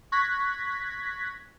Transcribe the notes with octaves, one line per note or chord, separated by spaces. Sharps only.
C#6 F#6 G#6 A#6 B6